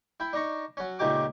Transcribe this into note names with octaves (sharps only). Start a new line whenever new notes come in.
E4 G5
D4 D#4 A#5 C#6
F#3 C#4
C#2 A#2 A3 D#4 G4 D6